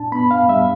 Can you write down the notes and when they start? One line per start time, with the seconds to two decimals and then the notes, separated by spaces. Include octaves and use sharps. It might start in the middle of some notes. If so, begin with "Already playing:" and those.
Already playing: A#2 D4 A5
0.12 B3 B5
0.31 F5
0.48 G3 E5